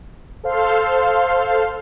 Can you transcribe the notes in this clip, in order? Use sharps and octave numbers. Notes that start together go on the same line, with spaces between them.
A4 C5 F5 C6